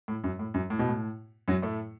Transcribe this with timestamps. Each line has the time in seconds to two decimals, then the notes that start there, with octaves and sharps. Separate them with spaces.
0.08 A2
0.24 F#2
0.39 A2
0.54 F#2
0.70 A2
0.79 B2
0.89 A2
1.48 F#2 F#3
1.63 A2 A3